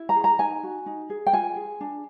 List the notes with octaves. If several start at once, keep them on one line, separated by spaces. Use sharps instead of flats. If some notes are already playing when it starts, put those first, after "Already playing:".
Already playing: E4
A#5
G#4
A#5
D#4 G#5
F#4
D#4
G#4
G5
F4 G#5
G#4
D4